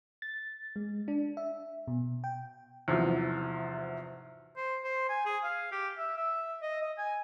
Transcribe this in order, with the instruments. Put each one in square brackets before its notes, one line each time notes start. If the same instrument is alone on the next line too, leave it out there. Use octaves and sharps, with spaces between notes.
[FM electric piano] A6
G#3
D4
E5
B2
G5
[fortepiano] E2 G#2 C3 F3 F#3
[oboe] C5
C5
G#5
G#4
F5
G4
E5
E5
D#5
D#5
G#5